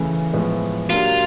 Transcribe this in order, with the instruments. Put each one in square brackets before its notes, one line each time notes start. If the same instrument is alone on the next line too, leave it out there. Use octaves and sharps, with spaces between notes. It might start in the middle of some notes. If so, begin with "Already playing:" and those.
Already playing: [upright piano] C#3 E3 A3
A2 F3 G#3 B3
[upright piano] F#3 A#3 D4 G4 [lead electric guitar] F4